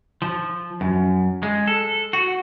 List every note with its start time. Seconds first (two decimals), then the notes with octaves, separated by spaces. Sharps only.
0.22 F3
0.81 F#2
1.43 G#3
1.67 A4
2.13 F#4